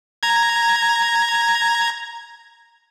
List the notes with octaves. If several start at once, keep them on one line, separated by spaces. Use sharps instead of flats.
A#5 G#6